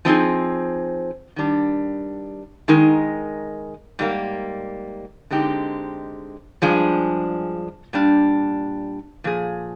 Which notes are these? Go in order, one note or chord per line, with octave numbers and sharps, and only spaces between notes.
F3 C4 D#4 G#4
D#3 G3 D4
D#3 G#3 D#4 A#4
G#2 G3 A#3
D3 G#3 C4 D#4 G4
G2 F3 G#3 D4 G#4
A#2 G3 D4
A#2 F3 G#4